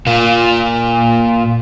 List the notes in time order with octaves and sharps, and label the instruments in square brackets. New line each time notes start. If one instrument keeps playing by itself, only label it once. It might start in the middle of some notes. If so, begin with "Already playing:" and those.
[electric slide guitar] A#2 A#3